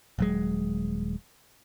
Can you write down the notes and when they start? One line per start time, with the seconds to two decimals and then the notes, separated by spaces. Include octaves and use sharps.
0.18 D#1 F#3 G#3